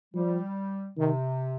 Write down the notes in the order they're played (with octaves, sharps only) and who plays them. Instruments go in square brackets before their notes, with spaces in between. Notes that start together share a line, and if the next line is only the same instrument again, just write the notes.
[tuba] F3 [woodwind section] G3
[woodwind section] C3 [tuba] D#3